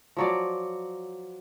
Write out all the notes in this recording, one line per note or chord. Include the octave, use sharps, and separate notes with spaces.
F3 F#3 D5